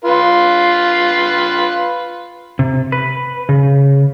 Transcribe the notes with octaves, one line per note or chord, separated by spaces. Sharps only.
F4 B4
C3
B4
C#3